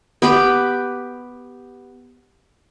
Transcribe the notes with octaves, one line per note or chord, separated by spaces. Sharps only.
B3 G4 B4